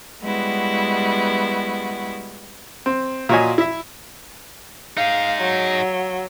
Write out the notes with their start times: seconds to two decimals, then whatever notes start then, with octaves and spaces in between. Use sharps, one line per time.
0.21 G3 G#3 B3 E4 F#4
2.86 C4
3.29 A#2 F4 F#4 C#5 D#5 G#5
3.58 E4 E5
4.97 D#4 G#4 F5
5.41 F#3